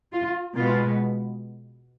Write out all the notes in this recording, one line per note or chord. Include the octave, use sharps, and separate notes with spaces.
F4
B2 G#3 B3 F4